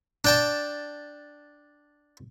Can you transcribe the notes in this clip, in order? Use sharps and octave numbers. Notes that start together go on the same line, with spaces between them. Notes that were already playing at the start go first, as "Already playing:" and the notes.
D4 G5 A5